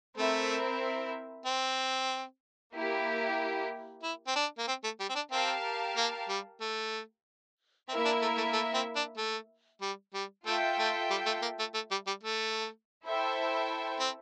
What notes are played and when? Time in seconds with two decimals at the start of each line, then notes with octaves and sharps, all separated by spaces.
0.18 A3 C4 E4 A#4 E5
1.46 C4
2.75 A#3 E4 G4
4.03 E4
4.28 C4
4.36 D4
4.58 A#3
4.68 C4
4.84 A3
5.00 G3
5.09 C4
5.15 D4
5.32 C4 G4 A#4 F5 A5
5.97 A#3
6.29 G3
6.61 A3
7.89 A#3 C4 E4 A#4 E5
8.05 D4
8.22 A3
8.37 A3
8.53 A3
8.74 C4
8.96 D4
9.17 A3
9.82 G3
10.14 G3
10.46 A3 F4 A4 E5 G5
10.79 A3
11.11 G3
11.26 A3
11.42 A#3
11.59 A3
11.74 A3
11.91 G3
12.07 G3
12.23 A3
13.03 E4 A4 C5 E5 G5
14.00 C4